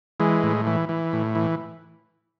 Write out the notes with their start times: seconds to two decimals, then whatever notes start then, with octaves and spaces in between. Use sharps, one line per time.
0.20 E3 G#3
0.43 A2
0.67 E3
0.89 E3
1.13 A2
1.35 E3